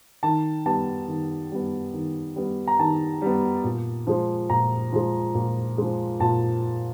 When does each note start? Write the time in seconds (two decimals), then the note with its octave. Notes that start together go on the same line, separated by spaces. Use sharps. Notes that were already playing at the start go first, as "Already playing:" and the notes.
0.23 D#3 A5
0.66 G3 B3 A5
1.08 D#3
1.51 G3 B3
1.93 D#3
2.36 G3 B3
2.67 A#5
2.79 D#3 A5
3.22 G3 B3
3.64 A#2
4.07 F3 G#3
4.49 A#2 A#5
4.92 F3 G#3
5.35 A#2
5.78 F3 G#3
6.20 A#2 A5